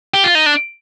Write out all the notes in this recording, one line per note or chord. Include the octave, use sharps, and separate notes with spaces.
G4
F4
D#4
D4